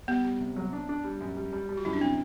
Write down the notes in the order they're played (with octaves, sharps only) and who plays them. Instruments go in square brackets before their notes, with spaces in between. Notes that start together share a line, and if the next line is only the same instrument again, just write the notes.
[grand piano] G3 [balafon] B3
[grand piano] G3
C3
F#3
D4
D4
G3
F#2
G3
G3
G3
[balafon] F#4
[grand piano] F#2 [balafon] E4
[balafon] D4
[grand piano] C3 [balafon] C4